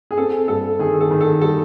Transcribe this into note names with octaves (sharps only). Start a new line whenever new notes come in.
G#4
C4 A4
G2 A4
D#3 G#4
A4
D#3
A4
G3 A4